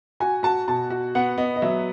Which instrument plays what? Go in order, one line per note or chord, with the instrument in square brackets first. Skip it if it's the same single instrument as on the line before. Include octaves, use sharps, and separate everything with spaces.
[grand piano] F#4 [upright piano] G#5
[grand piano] F#4 [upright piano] A5
[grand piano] B2 [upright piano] A5
[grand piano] F#4
[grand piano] B3 [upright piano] F#5
[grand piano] B3 [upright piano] D#5
[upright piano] D#5
[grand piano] F#3 [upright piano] E5